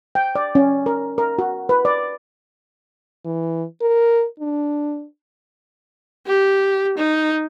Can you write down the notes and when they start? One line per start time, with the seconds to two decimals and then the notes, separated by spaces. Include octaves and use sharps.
0.15 G5
0.35 D5
0.55 C#4
0.86 A#4
1.18 A#4
1.39 F#4
1.69 B4
1.85 D5
3.25 E3
3.81 A#4
4.40 D4
6.27 G4
6.97 D#4